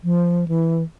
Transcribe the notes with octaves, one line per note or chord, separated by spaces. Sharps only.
F3
E3